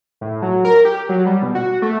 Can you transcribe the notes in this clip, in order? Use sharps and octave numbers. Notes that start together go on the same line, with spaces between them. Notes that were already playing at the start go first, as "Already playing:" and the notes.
A2
F#3
A#4
G4
F#3
G3
B2
F#4
A3